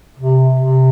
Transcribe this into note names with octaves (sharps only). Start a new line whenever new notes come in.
C3
C3